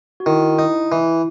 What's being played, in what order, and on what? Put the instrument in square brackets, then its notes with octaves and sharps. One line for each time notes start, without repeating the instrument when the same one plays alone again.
[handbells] F#4
[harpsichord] D#3 [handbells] E4
[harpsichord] D#4
E3